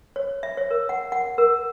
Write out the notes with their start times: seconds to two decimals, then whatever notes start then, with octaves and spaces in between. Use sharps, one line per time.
0.16 C#5
0.43 E5
0.57 C#5
0.71 A#4
0.89 F#5
1.12 F#5
1.38 A#4